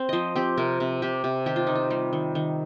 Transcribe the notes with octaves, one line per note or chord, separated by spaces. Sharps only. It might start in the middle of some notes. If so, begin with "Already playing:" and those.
Already playing: C4
F3 C5 D#5
C4 G4
C3 A#4
C3
C3 G4
C3
D#3 G4
F4
D#3 D#4
F4
G3
D#3
D#3